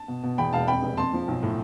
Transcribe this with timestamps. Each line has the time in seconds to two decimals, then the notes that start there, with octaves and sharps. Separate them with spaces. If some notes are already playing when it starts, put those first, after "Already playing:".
Already playing: A5
0.08 B2
0.23 B2
0.38 E2 G5 B5
0.52 E1 F5 A5
0.68 F2 G5 B5
0.83 F1
0.97 F2 A5 C6
1.13 F3
1.28 B1
1.43 A2